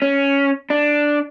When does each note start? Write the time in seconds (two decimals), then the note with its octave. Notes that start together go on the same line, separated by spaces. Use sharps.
0.02 C#4
0.70 D4